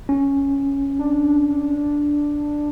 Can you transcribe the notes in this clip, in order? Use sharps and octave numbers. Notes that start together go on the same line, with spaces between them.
C#4
D4